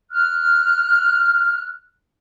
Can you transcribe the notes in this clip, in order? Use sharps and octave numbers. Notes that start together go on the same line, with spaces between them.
F6 F#6